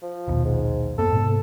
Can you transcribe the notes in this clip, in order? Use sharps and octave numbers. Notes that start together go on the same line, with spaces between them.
F3
A#1 D#2 B2
G#2
F#2 A#3 B3 A4
G#2 C3 B3